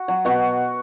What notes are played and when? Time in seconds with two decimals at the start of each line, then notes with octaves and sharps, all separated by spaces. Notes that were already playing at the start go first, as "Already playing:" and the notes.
Already playing: F#4
0.08 F#3
0.25 B2 F#4